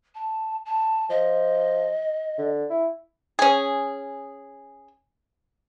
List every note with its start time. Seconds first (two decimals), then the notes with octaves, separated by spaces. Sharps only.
0.15 A5
0.66 A5
1.10 F3 D#5
2.38 D3
2.70 E4
3.39 C#4 G#4